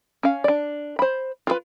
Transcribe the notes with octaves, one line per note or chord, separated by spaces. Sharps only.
C#4 F5
D4 D5
C5 B5
F4 G#4 B4